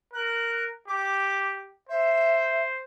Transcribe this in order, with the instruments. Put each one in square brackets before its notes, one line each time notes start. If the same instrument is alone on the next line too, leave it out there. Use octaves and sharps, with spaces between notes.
[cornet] A#4 [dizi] F#6
[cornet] G4 [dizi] D6
[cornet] C5 [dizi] E5